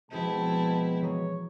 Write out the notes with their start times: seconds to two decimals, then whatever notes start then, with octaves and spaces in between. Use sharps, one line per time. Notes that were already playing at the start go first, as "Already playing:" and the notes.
0.11 B2 F3 G#3 C4 E4 G#4 A5 G6
1.02 E3 G#4 C#5 A#5